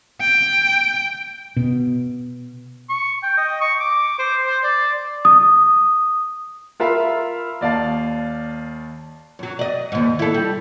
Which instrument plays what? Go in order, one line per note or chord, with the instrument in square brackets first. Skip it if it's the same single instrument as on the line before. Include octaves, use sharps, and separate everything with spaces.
[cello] G5
[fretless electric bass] B2
[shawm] C#6
G5
D#5
C#6
D6
C5
C5
D5
[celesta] D#6
[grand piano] F4 A#4 E5 F5 B5
D#2 D5 F5 A5
[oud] F#2 F#3
D5 D#5
D#2 G#2
E4 A4
G3